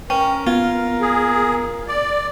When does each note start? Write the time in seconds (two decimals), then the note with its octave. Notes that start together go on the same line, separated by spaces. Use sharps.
0.10 C#4 A#4 G5
0.47 B3 F4
1.01 G#4
1.88 D5